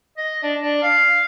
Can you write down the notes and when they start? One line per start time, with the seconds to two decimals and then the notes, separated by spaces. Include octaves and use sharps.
0.18 D#5
0.43 D4
0.60 D4
0.83 F5